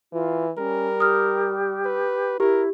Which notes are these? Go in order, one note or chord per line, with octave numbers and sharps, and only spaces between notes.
E3 F4
G3 C#4 A#4
G4 D#6 F6
B4
E4 G4 A#4